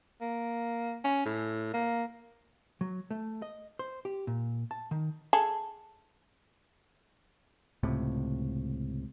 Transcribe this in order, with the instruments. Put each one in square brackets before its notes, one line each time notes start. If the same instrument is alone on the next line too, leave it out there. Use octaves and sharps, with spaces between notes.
[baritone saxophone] A#3
C#4
A2
A#3
[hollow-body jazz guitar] F#3
A3
D#5
C5
G4
A#2
A5
D#3
[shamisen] G#4 A4
[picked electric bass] C#2 A2 C3